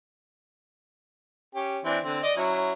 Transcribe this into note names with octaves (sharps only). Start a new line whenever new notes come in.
C#4 G4
E3 C4 D4
D3 C4
D5 D#5
F#3 C#4 E4